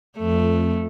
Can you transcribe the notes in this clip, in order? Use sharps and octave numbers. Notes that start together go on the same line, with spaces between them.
F2 A3